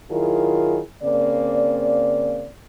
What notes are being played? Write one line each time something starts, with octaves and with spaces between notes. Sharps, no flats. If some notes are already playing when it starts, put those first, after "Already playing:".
D#3 F#3 E4 F4 G#4 A#4
C#3 A#3 C4 D5